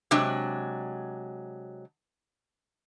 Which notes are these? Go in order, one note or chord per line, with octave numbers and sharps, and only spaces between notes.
C3 F#3 G#3 D4